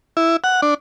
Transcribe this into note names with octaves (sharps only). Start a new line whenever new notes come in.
E4
F#5
D4